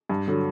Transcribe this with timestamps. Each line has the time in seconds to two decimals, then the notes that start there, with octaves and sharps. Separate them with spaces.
0.09 G2
0.28 D3 F#3